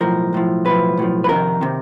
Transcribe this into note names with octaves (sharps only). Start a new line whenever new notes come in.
B1 A2 F3 A#4
B1 A2 F3
B1 A2 F3 B4
B1 A2 F3
B4
F2 C3 D#3 A#4
C3 D#3